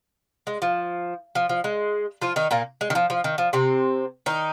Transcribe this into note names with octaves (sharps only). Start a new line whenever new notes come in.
G#3
F3
F3
F3
G#3
F3 F4
D#3 D#4
A#2 A#3
G#3
D#3
F3
F3
D#3
F3
C3 C4
D#3 D#4